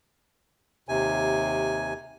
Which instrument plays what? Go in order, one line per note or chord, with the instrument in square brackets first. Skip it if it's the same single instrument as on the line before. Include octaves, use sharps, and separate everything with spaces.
[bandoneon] D#2 C3 G#5